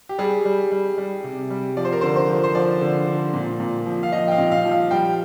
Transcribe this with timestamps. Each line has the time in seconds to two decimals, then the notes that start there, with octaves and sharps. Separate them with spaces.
0.09 G4
0.19 G3 G#4
0.45 G3
0.72 G3
0.98 G3
1.24 C3
1.50 G3
1.77 F3 D5
1.85 C5
1.93 A#4
2.01 D3 C5
2.16 C5
2.29 F3
2.43 C5
2.55 F3 D5
2.81 D3
3.07 D3
3.34 A#2
3.60 A#2
3.86 F3
4.03 F5
4.12 F3 D#5
4.28 G5
4.32 F5
4.38 A#2
4.52 F5
4.65 F3
4.71 F5
4.91 G3 G5